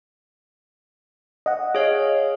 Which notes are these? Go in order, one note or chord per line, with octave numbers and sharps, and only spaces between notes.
D#5 F#5
G#4 C#5 D#5 F5